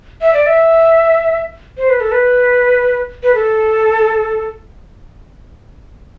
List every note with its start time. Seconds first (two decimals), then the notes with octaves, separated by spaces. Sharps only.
0.21 E5
0.33 D5
0.46 E5
1.78 C5
1.90 B4
2.00 A4
2.12 B4
3.23 B4
3.35 A4